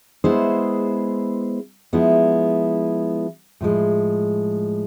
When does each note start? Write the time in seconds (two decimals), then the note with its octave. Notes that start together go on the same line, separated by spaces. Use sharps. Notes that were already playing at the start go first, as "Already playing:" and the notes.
0.24 G#3 B3 E4 G#4 C5
1.93 F3 G#3 B3 E4
3.61 A2 F3 G#3